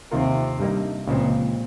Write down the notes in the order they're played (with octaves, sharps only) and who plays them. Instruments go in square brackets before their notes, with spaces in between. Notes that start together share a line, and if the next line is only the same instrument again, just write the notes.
[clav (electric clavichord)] D#2 D#3 A#3 F4 A#4 [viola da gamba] C3
[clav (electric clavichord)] G2 G3 A#3 D#4
[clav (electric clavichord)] C#2 C#3 F3 G#3 C4 [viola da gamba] A#2